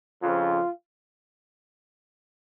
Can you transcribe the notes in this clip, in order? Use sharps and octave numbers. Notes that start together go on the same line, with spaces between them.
F2 C#3 F3 F4